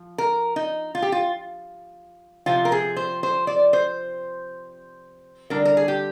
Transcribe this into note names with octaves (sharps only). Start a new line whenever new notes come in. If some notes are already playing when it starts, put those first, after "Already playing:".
Already playing: F3
A#4
D#4
F4
G4
F4
C3 F3 C4 F4
A#4
G#4
C5
C5
D5
C5
D3 G3 D4 A#4
A#4
G#4
G4